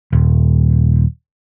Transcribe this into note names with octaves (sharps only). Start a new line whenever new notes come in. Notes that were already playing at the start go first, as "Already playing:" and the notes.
D#1